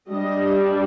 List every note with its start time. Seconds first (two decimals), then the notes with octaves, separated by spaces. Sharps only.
0.10 G3 D4 D#5